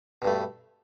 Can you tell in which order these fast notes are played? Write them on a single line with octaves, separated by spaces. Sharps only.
B2 G2 A3